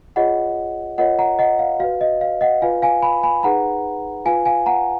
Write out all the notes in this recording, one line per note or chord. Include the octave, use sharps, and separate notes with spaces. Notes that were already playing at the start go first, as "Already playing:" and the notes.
F4 G#4 C#5 D#5 F#5
F4 A#4 C#5 D#5 F#5
F#5 A#5
D#5 F#5
F5
F#4 B4 F5
D#5
F5
D#5 F#5
F4 B4 F5 G#5
F5 G#5
G#5 B5
G#5 B5
D#4 G#4 B4 F#5 A#5
F4 B4 F5 G#5
F5 G#5
F#5 A#5